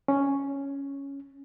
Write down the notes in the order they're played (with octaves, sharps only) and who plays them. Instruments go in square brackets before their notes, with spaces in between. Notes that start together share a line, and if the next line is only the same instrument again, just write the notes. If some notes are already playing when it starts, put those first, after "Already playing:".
[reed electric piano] C#4